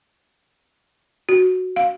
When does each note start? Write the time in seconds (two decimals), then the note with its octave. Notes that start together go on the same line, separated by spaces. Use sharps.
1.29 F#4
1.76 F5